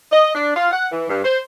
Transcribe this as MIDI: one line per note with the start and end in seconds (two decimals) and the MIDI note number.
0.12 0.33 75
0.35 0.53 62
0.55 0.70 65
0.71 0.88 78
0.92 1.06 52
1.09 1.20 43
1.24 1.39 72